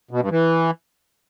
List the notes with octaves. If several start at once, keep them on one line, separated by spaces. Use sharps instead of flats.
B2
G2
E3